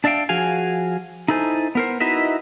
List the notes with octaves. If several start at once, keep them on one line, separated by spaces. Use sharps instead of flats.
D4 D5 E5 F5 G5
F3 F#4 G#4 F5 G#5
D#4 E4 A4 C5 G#5
B3 A#4 C5
D#4 E4 F#4 B4 D#5 E5